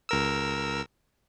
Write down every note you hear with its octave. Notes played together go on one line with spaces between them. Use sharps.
C#2 A#4 E6